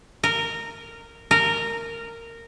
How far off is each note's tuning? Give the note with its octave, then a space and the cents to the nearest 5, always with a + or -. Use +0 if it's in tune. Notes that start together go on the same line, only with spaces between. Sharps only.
A#4 -15
A#4 -15